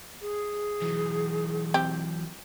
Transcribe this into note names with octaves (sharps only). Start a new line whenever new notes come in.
G#4
E3 F#3
C4 G4